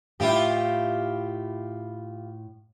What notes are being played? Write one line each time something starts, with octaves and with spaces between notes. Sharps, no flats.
A2 E4 F4 G4 E5